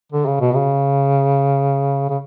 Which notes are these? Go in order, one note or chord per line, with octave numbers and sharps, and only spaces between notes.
D3
C#3
B2
C#3
C#3